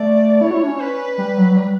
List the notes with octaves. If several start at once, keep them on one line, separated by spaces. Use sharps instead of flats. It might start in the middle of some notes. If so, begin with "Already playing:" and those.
Already playing: A3 D5
E4 C#5
F#4
E4
D4
C#4
C#4 B4
G3
F#3
F#3
G3